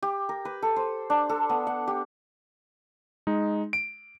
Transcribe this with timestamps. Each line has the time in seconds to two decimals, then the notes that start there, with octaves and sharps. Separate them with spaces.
0.02 G4
0.29 A#4
0.45 B4
0.62 A4
0.76 C5
1.10 D4
1.29 A4
1.49 B3
1.67 F#5
1.88 G4
3.27 G#3 D#4
3.73 D7